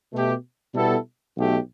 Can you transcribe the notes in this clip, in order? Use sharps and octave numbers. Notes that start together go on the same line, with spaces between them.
B2 A3 G4
B2 G3 B3 E4 A4
B1 B2 A3 G4